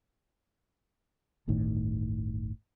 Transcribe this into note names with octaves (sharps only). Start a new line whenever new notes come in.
D1 G1 A2 D#3